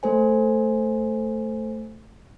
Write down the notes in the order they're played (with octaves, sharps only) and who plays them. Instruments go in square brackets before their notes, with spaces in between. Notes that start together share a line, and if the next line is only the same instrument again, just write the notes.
[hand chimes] A3 A4 C5 G#5